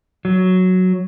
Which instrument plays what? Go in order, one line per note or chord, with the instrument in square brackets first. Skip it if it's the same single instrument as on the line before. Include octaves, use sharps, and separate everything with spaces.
[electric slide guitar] F#3